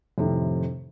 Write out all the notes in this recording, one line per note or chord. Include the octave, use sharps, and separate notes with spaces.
F2 A2 C3 D#3